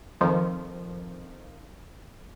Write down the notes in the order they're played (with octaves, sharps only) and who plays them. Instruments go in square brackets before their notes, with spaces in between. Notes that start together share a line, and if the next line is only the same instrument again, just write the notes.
[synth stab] F2 D#3 F3